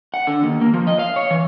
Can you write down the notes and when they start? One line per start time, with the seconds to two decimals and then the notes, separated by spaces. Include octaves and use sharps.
0.14 F#5
0.27 D3
0.43 D#2
0.61 A#3
0.74 F3
0.87 D#5
0.99 F5
1.16 C#5
1.31 E3